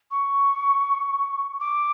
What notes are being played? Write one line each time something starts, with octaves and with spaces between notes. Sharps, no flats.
C#6
D6